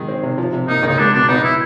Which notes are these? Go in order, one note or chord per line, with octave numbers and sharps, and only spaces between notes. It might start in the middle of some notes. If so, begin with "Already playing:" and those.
Already playing: D#3 G#3
C4
C3
F3
C3
A#3 D#4
C#2 D#4
G#3 D4
B2 D4
B3 D#4
E4